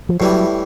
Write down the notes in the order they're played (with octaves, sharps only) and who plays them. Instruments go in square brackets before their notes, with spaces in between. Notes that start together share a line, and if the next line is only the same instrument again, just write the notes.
[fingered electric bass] F3
[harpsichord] A2 E3 G3 [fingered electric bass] F#3